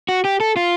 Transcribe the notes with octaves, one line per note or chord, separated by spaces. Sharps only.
F#4
G4
A4
F4